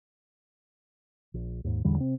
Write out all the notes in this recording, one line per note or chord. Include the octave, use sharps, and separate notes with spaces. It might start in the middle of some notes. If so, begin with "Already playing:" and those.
A#1
D#2 G#2
A1 E2 D3 G3
C3 C4